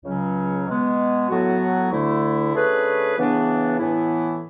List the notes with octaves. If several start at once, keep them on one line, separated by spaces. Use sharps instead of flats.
C#2 C#3 F#3 C#4
B2 G#3 B3
A2 F#3 B3 F#4
D2 D3 A3 E4
D3 A3 C#4 G#4 B4
C#3 E3 B3 D4
A2 E3 B3 E4